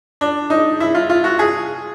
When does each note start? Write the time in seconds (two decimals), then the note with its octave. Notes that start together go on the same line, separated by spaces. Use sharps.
0.21 D4
0.50 D#4
0.80 E4
0.95 F4
1.09 F4
1.24 F#4
1.39 G#4